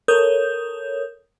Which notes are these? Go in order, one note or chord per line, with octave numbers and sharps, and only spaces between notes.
A4 A#4 C#5 D#6 G6